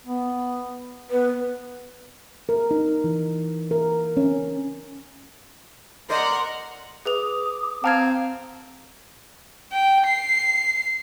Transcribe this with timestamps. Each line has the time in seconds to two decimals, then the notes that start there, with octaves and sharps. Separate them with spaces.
0.07 B3
1.11 B3 B4
2.49 A#4
2.71 D#4
3.04 E3
3.71 A#4
4.17 C#4
6.10 A#4 C5 D5 D#5 F#5 C6
7.05 G#4 B4 D6 D#6 F7
7.84 C4 F5 A5 A#5 G#6
9.73 G5
10.08 C7